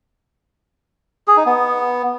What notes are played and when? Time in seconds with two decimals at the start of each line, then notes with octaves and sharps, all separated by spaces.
1.28 G#4
1.37 D#4
1.46 B3